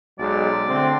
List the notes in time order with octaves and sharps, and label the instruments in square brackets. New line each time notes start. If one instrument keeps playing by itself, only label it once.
[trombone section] B1 F#3 G#3 [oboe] D5
[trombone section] D3 A3 C4